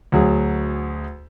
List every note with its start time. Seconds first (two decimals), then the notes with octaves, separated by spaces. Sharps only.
0.12 D2 F#3 G#4